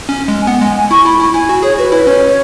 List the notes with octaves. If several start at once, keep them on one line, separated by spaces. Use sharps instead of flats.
C#4
G#3
G#5
B3 F#5
G#3 G#5
G#5
E4 C#6
E4 B5
E4
E4 G#5
F#4
G#4 C#5
F#4 B4
E4 B4
C#4 C#5